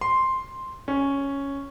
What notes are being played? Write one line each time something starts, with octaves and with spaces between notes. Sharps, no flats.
C6
C#4